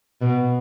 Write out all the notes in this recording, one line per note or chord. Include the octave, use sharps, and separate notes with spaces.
B2